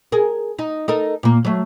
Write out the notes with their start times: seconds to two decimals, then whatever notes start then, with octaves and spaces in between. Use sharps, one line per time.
0.12 G#4 A#4
0.59 D#4
0.88 D#4 A4 A#4
1.23 A#2 A#3
1.45 F#3 A3